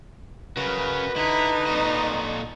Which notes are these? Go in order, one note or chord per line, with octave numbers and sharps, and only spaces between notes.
C#3 F#4 A#4 B4
D3 D#4 E4
A#2 F#4 A4 D#5